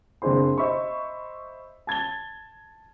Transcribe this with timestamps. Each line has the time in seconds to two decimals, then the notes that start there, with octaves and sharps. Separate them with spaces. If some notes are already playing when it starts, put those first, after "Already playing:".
0.22 F#1 C4 D4 G#4 C5 C6
0.58 C5 D#5 E5 B5 C#6
1.87 A5 G#6 A6 G7